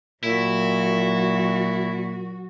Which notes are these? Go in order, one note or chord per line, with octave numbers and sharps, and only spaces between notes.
A#2 F#3 E4 F#4